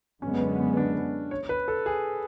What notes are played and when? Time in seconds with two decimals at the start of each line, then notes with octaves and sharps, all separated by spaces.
0.22 F#2 D3 G#3 B3 C#4
0.77 D4
1.31 C#5
1.49 B4
1.68 A4
1.86 G#4